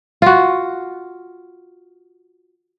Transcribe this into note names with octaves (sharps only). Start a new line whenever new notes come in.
F4 F#4